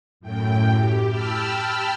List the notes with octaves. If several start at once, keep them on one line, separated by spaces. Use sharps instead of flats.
F#2 A2 G5
G4
G5 A5 B5 E6 F6